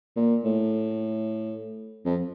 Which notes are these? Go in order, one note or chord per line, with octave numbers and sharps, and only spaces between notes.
A#2
A2
F2